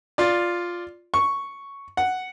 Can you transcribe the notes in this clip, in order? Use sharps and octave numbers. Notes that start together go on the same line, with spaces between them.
F4 D5
C#6
F#5